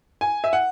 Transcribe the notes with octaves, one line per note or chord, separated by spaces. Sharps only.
G#5
E5
F#5